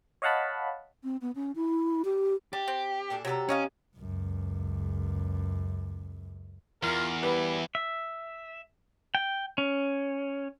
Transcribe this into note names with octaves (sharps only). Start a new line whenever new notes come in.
C#5 D#5 F5 F#5 A5 B5
C4
B3
C#4
E4
G4
D4 G4
C4
A#2 D4 A4
C3 F#3 A4 A#4 A#5
C#4 C#5 D#5 F5
C#2 F#2
E2 F4 A#4
G3 E4 B4
E5
G5
C#4